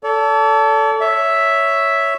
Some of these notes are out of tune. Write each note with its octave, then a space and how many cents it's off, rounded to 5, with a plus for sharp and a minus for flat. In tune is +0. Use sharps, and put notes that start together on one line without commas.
A4 +0 D5 -45
C#5 +5 E5 +0